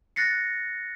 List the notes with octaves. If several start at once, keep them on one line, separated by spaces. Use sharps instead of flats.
F#6 A6 A#6 C7 C#7